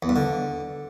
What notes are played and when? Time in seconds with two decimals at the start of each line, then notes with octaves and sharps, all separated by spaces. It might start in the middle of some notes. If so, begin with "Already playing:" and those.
0.03 E2
0.09 G2
0.16 D3